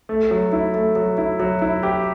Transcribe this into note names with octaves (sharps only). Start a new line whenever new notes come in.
A3
F#3
E4
A3
F#3
E4
F#3
E4
G4